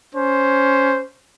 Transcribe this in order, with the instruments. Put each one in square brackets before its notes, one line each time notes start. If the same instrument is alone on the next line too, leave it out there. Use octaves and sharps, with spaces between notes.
[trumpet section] C#4 C5